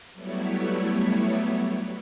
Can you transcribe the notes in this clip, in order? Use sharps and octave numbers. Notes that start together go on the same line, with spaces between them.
F#3 G3 A3 B3 E4 C#5